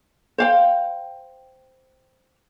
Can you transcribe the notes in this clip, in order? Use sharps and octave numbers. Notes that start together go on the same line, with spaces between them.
C5 F5 G5